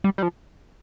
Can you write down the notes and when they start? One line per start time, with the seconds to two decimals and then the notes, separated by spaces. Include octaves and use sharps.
0.04 G3
0.18 G3
0.23 F3